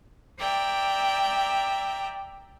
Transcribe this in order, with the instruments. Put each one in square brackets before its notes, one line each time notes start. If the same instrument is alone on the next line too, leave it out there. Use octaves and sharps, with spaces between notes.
[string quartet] D5 E5 G5 A#5